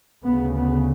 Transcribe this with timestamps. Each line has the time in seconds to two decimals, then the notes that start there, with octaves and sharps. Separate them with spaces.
0.23 D2 C#3 B3
0.54 B3